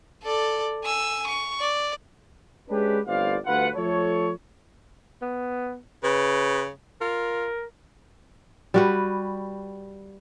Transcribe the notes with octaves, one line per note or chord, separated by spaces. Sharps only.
A4 D5
G#5 E6
C#6
D5
G#3 C#4 D4 G4 B4
G1 A2 C4 D5 F5
D2 G2 F4 B4 F#5
F3 A3 A4 C#5
B3
C#3 B4
F4 A#4
G3 F#4 B4